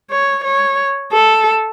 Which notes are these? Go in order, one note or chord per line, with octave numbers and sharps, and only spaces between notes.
C#5
C#5
A4